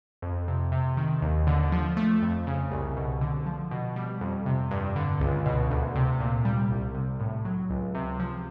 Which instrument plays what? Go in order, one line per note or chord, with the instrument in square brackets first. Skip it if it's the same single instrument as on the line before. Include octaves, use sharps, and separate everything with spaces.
[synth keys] F2
C3
C3
D#3
D#2
D3
F3
A3
F2
C#3
C2
B2
D3
F3
B2
G3
F2
C3
G2
D3
C#2
B2
D2
C3
A#2
G3
C2
C3
A2
F#3
C#2
C3
F3